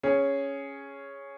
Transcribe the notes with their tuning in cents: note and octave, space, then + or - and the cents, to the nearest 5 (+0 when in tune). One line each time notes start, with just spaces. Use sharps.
C#4 +0 G#4 +0